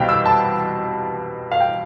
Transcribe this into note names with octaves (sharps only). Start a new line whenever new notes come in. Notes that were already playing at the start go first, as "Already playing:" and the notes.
Already playing: C2 B2 G3 C4 F5 G5
E6
A5
F5
G5